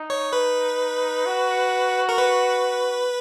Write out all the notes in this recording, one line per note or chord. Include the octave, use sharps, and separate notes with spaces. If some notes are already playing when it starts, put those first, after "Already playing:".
Already playing: D#4
C#5
B4
F#4
A#4
B4